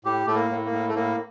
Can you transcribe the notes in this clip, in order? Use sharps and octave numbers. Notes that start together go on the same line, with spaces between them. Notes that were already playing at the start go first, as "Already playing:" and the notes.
A2 G4
A2 A3
A#3
A2
A#3
A2
A3
A2 A#3